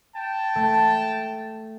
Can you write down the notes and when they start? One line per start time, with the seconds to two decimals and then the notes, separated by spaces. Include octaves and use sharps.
0.15 G5 A5
0.56 A3